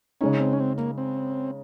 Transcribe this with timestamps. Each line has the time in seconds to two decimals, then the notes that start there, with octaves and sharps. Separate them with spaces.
0.21 C#3 G#3 C#4 D#4
0.40 C4
0.53 C#4
0.60 C4
0.78 A#3
0.98 C4